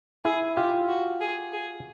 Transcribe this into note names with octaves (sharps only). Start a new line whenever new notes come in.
E4 G#4
F4 G4
F#4
G#4
G#4